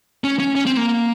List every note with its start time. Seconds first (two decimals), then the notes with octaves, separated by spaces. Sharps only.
0.24 C#4
0.39 C#4
0.55 C#4
0.66 C4
0.77 A#3